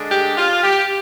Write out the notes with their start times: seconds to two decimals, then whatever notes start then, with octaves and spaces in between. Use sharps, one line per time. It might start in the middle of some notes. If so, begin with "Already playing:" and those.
Already playing: D3 G#3 D4
0.11 G4
0.37 F4
0.63 G4